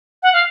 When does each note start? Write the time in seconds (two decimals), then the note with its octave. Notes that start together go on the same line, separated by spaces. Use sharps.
0.22 F#5
0.33 F5